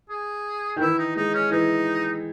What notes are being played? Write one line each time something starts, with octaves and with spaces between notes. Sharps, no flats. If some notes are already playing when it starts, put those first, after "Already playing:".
G#4
D#3
E3 E4
D#4
G#3 D#4
C#4
E3 D#4